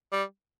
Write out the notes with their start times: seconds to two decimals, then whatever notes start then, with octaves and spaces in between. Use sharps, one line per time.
0.13 G3